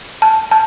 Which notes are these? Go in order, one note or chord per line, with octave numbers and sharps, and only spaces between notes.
A5
A5